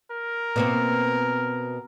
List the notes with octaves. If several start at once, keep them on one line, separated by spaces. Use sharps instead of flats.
A#4
B2 A#3 C4